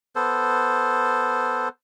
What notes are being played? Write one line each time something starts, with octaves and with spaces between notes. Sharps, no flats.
B3 A4 C5